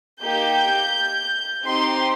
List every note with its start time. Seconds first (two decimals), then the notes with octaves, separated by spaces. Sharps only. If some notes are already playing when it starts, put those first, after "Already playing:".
0.22 A#3 D#4 G4 G6
1.66 C4 D#4 G4 C6